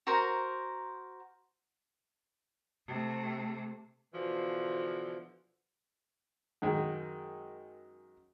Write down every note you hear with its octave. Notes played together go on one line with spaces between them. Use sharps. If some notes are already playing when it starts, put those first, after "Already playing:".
F#4 A#4 C5 A#5
C3 A3
B2 D3 E3 F3
F#2 D#3 G#3